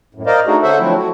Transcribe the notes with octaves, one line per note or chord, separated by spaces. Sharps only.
F#2 A2
A#4 C5 D5 D#5 F5
A3 D4 D#4 F#4 G#4
D3 C#4 A4 C5 E5 F#5
F3 F#3 A3 C4 D4 E4
A3 F#4